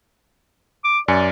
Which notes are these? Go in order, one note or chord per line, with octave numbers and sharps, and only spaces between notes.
D6
F#2 D5 G#5 C#7